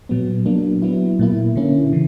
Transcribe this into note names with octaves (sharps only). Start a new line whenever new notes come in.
A#2 F#3 B3
F#3 A#3 D4
F#3 B3 E4
A#2 A#3 E4
D3 A#3 C#4 E4
C#3 E3